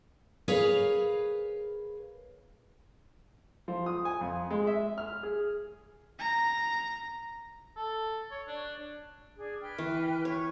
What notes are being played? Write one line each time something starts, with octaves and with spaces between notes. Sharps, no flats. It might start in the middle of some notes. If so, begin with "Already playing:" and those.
G#4 A#4 B4 C#5 F5
F3
D#6
G#5
F2
G#3
E5
F6
G#4
A#5
A4
C#5
D4
D4 G#4
B4 G5 F6
E3
C#5